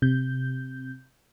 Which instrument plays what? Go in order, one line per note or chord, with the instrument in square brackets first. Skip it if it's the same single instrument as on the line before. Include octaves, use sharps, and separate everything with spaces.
[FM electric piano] C3 G6